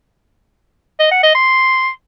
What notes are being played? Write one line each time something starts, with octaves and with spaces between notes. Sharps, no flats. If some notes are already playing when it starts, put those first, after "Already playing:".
D#5
F#5
D#5
C6